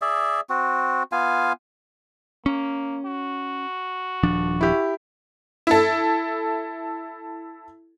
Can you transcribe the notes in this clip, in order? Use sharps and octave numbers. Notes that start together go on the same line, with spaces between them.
G#4 D5 E5
C4 F#4
B3 F4 F5 G#5
A#3 C#4
F#4
D#1 F3 D4
E4 G4
E4 A4